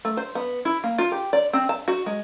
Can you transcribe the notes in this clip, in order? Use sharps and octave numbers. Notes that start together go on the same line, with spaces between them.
A3
C5
B3
E4
A#3
F4
G4
D5
C4
A5
F#4
G#3